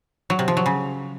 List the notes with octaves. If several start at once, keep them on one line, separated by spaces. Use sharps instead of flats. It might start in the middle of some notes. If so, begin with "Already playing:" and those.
F#3
C3
F3
F#3
C#3